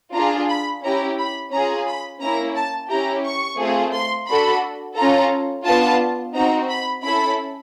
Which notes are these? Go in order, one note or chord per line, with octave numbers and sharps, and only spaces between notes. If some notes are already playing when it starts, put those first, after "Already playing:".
D4 F4 G#4 A#5
B5
C#4 E4 G4 A#5
B5
C#4 F4 G#4 A#5
B5
A#3 C#4 E4 A#5
A5
C#4 E4 G4 A#5
C#6
A3 C4 F4 G#4
C6
D4 F#4 A4 B5
C#4 F4 A4 A#5
B3 D4 F4 A5
C4 D#4 F#4 A#5
B5
C#4 E4 A4 B5